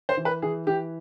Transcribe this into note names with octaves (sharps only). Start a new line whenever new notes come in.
C5
E3
B4
E3 G#4
E3 G4